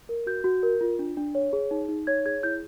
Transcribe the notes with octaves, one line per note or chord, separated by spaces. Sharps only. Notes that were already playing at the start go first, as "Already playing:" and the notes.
A#4
F#4 G6
F#4
A#4
F4
D4
D4
C#5
G#4
D#4
D#4
C#5 G#6
G#4 G#6
E4 G6